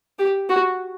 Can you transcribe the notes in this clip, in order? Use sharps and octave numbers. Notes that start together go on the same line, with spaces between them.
G4
F#4